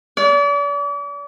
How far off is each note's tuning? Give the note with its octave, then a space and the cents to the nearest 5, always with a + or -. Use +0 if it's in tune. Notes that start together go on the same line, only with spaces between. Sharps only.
D5 -40